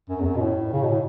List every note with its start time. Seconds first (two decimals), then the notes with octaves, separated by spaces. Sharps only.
0.10 F#2
0.20 E2
0.25 F#2
0.36 B2
0.41 A2
0.73 C#3
0.82 B2
0.90 A2